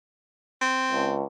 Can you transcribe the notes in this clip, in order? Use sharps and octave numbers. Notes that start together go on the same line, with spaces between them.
C4
C#2